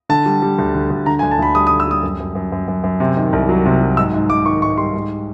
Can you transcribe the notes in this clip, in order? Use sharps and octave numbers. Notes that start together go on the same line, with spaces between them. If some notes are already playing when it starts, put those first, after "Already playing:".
D3 A5
G3
G3
D2
D3
D2
D3 A#5
G#5
D2
A5
D2 B5
G3 D#6
D#6
D3
E6
G3 D#6
F#2
F#2
F#2
F#2
F#2
F#2
C3
D#3
C2
F#3
C3
F#3
G#2 E6
G#2
G#2 D6
D#3 C#6
G#2 C#6
G3 C6
G#2